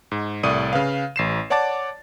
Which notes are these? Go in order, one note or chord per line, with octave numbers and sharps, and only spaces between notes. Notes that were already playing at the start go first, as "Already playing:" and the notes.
G#2
C2 A2 A3 D5 D#6 D#7
C#3 B4 F5
A1 C7 E7
C#5 D5 F#5 A5 D6 A6